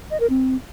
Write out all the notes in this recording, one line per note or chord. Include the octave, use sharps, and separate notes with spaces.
D#5
A#4
C4